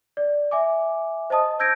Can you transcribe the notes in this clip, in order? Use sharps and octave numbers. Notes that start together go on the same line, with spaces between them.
D5
E5 G#5 D6
C5 D#5 A5 D#6
E6 G6 G#6 A#6 D7